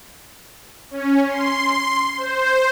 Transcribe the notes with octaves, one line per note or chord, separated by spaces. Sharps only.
C#4
C6
C5